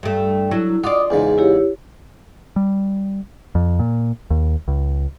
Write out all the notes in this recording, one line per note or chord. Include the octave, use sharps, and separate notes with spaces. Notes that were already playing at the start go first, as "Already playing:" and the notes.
G2 A3
F#3 E4 A4
F4 F#4 D5 D6 D#6
E2 G#2 C#3 G#5
E4 G4 C#5
G3
F2
A#2
D#2
C#2